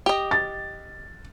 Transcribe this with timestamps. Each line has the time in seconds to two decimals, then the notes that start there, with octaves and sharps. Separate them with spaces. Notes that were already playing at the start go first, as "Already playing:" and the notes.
0.06 G4 D#5
0.31 A6